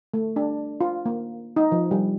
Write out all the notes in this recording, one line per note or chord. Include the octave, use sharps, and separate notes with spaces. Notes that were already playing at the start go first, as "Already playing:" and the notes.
A3
D4
F4
A#3
D#4
F3
G3